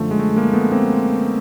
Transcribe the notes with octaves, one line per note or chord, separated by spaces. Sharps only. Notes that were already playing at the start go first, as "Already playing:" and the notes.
Already playing: F#2 D3 F3 A3
G#3
A3
G#3 A#3
A3 B3
A#3 C4